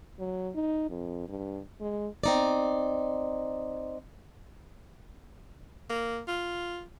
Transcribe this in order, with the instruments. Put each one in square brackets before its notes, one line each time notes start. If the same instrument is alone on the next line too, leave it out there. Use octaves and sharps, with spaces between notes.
[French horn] F#3
D#4
F2
G2
G#3
[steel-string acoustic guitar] C4 D#4 D5
[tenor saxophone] A#3
F4